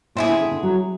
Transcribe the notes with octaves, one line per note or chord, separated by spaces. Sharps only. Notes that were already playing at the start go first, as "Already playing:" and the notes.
A#2 C4 E4 G#4
D3
D3
D3
F#3